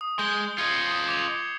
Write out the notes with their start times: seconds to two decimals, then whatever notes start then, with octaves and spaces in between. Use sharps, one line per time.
0.01 D#6
0.19 G#3 G6 G7
0.58 F4 D#5 G#6 C7 C#7
1.08 D6 F7